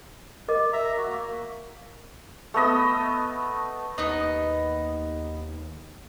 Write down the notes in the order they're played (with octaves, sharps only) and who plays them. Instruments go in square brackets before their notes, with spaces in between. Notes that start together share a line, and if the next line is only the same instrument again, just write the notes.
[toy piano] A#4 D#5 D6
[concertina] E5 A#5
F#4
A#3
[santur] A3 B3 D#5 E6
[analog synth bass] D#2 [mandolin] B3 D#4 D#5